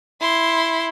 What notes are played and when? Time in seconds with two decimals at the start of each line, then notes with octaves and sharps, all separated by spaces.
0.21 E4 C6